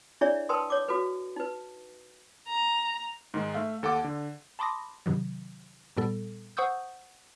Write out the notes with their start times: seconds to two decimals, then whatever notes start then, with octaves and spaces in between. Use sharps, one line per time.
0.21 D4 E4 G#4 C#5 D5 E5
0.49 A#4 B4 G5 A5 C6 D#6
0.70 C#5 D6
0.88 F#4 A4 B4
1.36 D#4 B4
2.48 A#5
3.34 G#2 D#3 G#3
3.54 A3 E5 F5
3.83 D#2 A4 F#5 D6
4.04 D3
4.59 A5 B5 C6 D6 D#6 A#6
5.06 G2 C3 D#3 F#3
5.97 G2 A#2 G3 B3 A4
6.57 C5 F#5 C#6 D#6 E6 G6